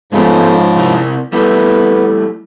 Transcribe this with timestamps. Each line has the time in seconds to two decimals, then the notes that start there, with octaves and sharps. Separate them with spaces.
0.12 G#2 C#3 F3 G#3 A3 B3
0.76 C3 E4 A#4
1.32 G3 A3 B3 E4